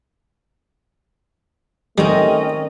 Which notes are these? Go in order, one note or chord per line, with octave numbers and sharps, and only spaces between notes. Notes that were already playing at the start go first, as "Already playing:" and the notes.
D#3 G3 A3 C4 C#4 D#5